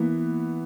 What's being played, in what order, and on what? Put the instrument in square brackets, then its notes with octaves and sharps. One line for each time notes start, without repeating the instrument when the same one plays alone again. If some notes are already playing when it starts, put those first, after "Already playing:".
Already playing: [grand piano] E3 B3 [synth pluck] A#3